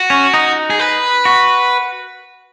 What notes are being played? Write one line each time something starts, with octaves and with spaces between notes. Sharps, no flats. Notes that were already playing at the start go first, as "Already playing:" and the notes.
Already playing: F#4
C#4
D#4
G#4
B4
F#4